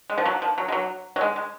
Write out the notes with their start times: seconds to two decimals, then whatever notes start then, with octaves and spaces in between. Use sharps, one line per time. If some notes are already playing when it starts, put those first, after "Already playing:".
0.10 G#3
0.18 F3
0.26 F#3
0.42 F3
0.58 F#3
0.68 G#3
0.72 F#3
1.16 F#3
1.21 G#3
1.36 G#3